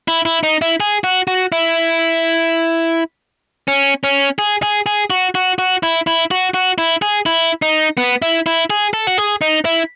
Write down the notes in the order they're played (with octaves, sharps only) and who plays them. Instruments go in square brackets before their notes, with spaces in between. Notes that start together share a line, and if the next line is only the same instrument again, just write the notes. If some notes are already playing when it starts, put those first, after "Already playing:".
[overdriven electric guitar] E4
E4
D#4
E4
G#4
F#4
F#4
E4
C#4
C#4
G#4
G#4
G#4
F#4
F#4
F#4
E4
E4
F#4
F#4
E4
G#4
E4
D#4
B3
E4
E4
G#4
A4
F#4
G#4
D#4
E4